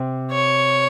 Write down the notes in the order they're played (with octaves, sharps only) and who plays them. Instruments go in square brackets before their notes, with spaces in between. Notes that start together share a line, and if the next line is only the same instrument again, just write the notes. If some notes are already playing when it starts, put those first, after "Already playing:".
Already playing: [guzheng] C3 C4
[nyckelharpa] C#5